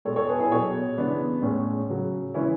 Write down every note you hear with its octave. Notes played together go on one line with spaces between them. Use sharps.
B2 G#3 A4 C#5
A4 C#5
G#4 B4
E4 G#4
B2 F#3 A4 C#5
C#3 E3 G#3 B3 D4
A2 G#3 C#4
C#3 F#3
C#3 E3 G#3 C#4 E4